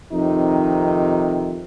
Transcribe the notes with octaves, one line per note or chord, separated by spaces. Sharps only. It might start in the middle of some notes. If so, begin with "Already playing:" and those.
F2 C3 D#3 D#4